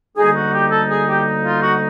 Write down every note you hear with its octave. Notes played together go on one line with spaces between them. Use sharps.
D2 D3 G3 A#3 D#4 G#4
F#4
G4
A4
G#4
G4
F4
F#4